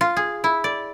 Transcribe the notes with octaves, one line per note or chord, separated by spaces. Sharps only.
F4
G#4
E4
D5